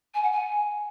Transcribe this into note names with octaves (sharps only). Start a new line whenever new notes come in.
G#5
F#5
G#5